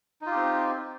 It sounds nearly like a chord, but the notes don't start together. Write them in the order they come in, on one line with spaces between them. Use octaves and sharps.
D#4 F4 G4 C4